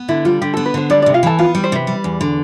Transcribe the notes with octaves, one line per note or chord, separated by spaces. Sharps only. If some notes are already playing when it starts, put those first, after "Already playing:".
Already playing: B3
D3 E4
G3 F4
D3 G4
B3 A4
B4
D3 C5
G3 D4 D5
C3 D4 D5
F4 F5
E3 A4 A5
B3 F4 F5
G3
C5
C3 B4
G3
E2
D3